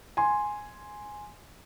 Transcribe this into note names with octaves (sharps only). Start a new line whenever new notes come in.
G#5 C6